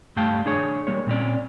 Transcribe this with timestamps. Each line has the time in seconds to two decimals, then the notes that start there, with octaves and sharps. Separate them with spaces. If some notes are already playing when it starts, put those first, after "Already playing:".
0.16 G2 G3 A3 F5 G5 A5
0.46 D4 G#4 C#5
0.87 G3 A#3 C#5
1.07 A#2 C4 C#4 D5